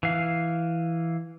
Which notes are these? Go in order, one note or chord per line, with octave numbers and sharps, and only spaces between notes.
E3 F5